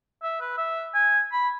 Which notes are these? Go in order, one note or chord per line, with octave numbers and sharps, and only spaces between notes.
E5
B4
E5
G#5
B5